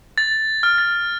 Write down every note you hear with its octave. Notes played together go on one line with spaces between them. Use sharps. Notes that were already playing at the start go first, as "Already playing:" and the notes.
A6
F6
A6